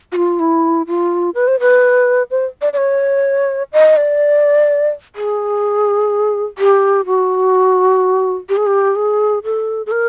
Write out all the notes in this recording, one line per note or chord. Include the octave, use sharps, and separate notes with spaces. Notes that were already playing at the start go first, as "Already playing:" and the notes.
F#4
F4
E4
F4
B4
C5
B4
C5
D5
D5
C#5
D#5
D5
G#4
G4
F#4
G4
G#4
G4
G#4
A4
A4
A#4